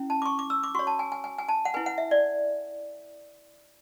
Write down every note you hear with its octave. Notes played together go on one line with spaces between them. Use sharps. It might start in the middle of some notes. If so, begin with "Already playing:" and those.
Already playing: C#4 E4
A5
D6
C#6
D6
E6
D6
F#4 C#5 C#6
A5
G#5
G#5
G#5
G#5
A5
F#5
E4 B4 G#5
F#5
E5
D5